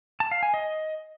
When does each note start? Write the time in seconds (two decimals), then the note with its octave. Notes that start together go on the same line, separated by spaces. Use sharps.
0.20 A5
0.31 F5
0.43 G#5
0.54 D#5